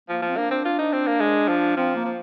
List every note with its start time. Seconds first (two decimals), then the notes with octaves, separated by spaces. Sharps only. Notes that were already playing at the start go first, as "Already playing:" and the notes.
0.09 F3 A#3
0.22 F3
0.29 C4
0.37 A#3 D4
0.51 C4
0.65 F4
0.79 D#4
0.93 C4
1.07 A#3
1.20 G#3
1.49 F3
1.77 F3 C4
1.95 A#3
2.05 F3